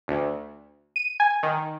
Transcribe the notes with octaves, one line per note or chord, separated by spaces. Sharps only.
D2
D#7
G#5
D#3